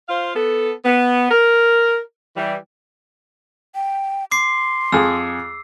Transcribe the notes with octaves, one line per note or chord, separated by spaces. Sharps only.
F4 C5 F5
B3 A4
B3
A#4
E3 G3
G5
C6 D6 C7
F2 G#4 E6